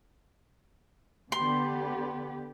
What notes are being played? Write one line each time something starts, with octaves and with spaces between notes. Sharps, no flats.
D3 B3 G4 C6